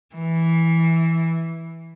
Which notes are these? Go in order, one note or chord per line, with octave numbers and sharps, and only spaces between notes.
E3